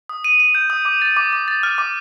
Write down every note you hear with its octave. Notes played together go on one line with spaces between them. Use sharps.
D#6
D#7
D#7
G6
D#6
D6
A6
D6
D6
A6
F6
D6